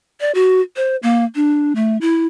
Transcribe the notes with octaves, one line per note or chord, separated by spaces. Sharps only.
D5
F#4
C5
A#3
D4
A3
E4